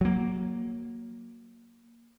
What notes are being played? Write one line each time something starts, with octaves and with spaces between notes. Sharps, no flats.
F#3 A#3